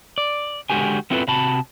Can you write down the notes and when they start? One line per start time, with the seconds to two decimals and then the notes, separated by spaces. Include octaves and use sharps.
0.18 D5
0.70 D3 G#3 F#4 G4 G#5
1.10 B3 C4 E4 F4 A4 B4
1.28 C3 F#4 A5 B5